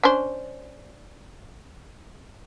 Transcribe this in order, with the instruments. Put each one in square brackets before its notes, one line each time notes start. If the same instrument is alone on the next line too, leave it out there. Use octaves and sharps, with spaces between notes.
[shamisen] C#4 D4 C5